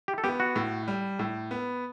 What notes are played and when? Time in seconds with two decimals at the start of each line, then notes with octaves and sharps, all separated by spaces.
0.08 G4
0.18 A4
0.24 B3 G4
0.40 F#4
0.56 A2
0.88 G3
1.19 A2
1.51 B3